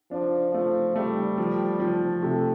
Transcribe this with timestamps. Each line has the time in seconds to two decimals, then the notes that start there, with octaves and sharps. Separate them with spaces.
0.11 F3 D4
0.54 F3 A3
0.96 G3 A3
1.38 F3
1.80 F3
2.22 C3 A3